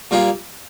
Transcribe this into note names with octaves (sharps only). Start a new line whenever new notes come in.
A#2 G3 A#3 F4 G#4